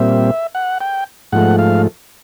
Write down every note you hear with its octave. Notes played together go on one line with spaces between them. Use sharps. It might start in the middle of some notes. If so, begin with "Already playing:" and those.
Already playing: A#2 G3 C4 E5
F#5
G5
G#2 F3 A3 F#5
F5